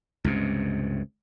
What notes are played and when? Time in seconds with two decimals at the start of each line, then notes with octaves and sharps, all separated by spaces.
0.24 C#2 G2 C3